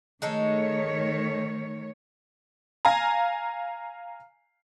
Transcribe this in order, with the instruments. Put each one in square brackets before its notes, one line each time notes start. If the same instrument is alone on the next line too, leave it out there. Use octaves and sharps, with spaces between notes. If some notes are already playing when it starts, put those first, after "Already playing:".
[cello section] D#3 A3 C#5 [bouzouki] G#3 D#4 A4
[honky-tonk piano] F5 G#5 A#5